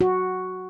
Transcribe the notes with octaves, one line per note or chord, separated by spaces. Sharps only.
F#4